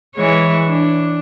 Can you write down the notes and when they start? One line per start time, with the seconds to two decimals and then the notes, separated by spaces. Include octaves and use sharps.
0.15 E3 G#3 C#5
0.66 D4